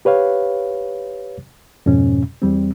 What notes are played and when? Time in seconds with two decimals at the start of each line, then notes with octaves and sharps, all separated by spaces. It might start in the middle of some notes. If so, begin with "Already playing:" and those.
0.05 G4 B4 C#5 F5
1.86 F2 G#2 B2 C#4
2.42 E2 G3 C4